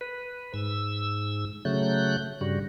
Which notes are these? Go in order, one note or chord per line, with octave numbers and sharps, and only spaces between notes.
B4
G#2 E6
C#3 F#3 A3 F#6 G6
G2 C#3 G3 F#4